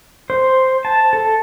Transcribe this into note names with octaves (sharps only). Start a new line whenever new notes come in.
C5
A5
A4